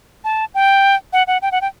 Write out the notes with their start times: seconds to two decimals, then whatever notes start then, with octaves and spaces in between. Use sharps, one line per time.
0.24 A5
0.54 G5
1.13 F#5
1.27 F#5
1.42 G5
1.52 F#5
1.61 G5